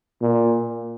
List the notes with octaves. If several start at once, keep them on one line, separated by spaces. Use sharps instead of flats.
A#2